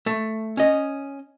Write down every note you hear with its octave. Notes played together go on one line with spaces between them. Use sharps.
A3
C#4 D#5